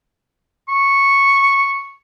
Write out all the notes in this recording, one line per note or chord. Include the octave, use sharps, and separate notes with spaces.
C#6